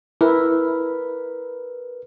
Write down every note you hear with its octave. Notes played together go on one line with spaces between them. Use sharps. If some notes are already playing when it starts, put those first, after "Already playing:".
E4 A#4 B4